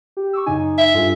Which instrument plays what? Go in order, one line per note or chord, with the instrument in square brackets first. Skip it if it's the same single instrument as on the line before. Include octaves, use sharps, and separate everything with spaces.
[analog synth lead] G4
[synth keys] C#6 D6 E6
[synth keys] F#2 C#3 G#5 [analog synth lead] D#4
[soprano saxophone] E5
[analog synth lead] G2 [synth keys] F4 A4 G#5